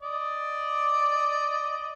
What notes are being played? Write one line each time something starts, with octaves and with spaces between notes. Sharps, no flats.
D5 D#5